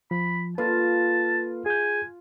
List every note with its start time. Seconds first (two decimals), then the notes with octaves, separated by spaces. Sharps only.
0.11 F3 B5
0.58 A#3 F4 A4 B4 F5 A5
1.66 G#4 G#5 G6